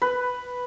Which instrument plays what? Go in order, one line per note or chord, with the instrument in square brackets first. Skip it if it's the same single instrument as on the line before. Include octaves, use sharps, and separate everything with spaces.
[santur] B4